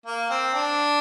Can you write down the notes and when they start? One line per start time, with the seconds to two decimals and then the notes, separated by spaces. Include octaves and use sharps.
0.06 A#3
0.30 C4
0.54 D4